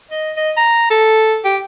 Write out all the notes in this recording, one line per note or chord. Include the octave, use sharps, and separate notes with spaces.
D#5
D#5
A#5
A4
G4